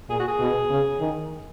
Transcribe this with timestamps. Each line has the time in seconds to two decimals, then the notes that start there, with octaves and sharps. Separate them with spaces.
0.09 A#2 G#4
0.19 F#4
0.28 G#4
0.40 B2
0.70 C#3
1.00 D#3